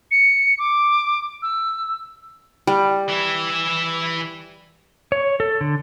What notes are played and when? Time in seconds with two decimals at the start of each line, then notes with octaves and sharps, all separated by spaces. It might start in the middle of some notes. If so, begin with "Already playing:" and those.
0.11 C#7
0.59 D6
1.42 E6
2.67 G3
3.09 E3 E4
5.12 C#5
5.40 A4
5.61 D3